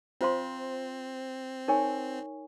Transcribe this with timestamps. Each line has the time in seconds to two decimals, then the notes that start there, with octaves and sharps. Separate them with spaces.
0.21 C4 F4 C5 F5 C6
1.68 D#4 A#4 C#5 G#5 C#6